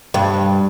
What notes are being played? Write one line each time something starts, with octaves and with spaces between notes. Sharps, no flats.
G2